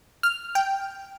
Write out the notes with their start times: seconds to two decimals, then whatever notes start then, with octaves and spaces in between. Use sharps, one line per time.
0.23 F6
0.55 G5